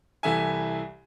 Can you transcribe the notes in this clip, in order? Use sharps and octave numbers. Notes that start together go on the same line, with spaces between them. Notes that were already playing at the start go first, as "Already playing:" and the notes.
C2 E3 A4 E5 G#5